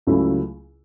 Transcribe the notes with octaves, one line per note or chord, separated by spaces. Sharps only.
C#2 C#3 F#3 A3 E4